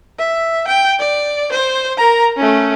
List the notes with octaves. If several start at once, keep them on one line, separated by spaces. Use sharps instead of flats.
E5
G5
D5
C5
A#4 A#5
A3 C#4